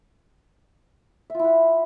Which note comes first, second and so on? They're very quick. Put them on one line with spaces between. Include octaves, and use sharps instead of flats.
E5 F4 E4 F#5